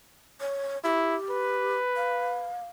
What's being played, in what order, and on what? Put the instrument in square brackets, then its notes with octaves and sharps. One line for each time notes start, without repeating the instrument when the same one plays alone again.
[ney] C#5
[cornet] E4 [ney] G4
[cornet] B4
[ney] F5